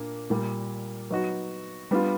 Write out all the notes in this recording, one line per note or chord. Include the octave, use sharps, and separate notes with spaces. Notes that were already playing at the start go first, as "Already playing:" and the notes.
Already playing: A#2 A#3 D4
A#2 G3 A#3
F#3 B3 D#4 F#4
G3 B3 D4 F4